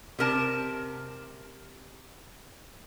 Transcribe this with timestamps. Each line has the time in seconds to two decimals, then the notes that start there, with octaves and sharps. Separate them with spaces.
0.19 C3 A#4 A5